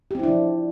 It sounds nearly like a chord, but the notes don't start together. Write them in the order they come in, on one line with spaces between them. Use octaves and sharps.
G4 C4 E4 D4 F3